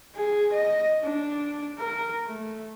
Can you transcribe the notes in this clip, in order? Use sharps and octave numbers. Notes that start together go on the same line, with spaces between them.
G#4
D#5
D4
A#4
A3